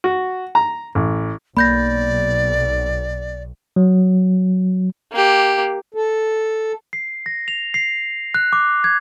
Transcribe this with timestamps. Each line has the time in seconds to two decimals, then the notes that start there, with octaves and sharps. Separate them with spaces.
0.04 F#4
0.55 A#5
0.95 A1
1.57 B1 A#3 D5 B5 G6 A#6
3.76 F#3
5.12 A#3 G4
5.94 A4
6.93 C7
7.26 A#6
7.48 F7
7.74 C7
8.34 F#6
8.53 D6
8.84 G#6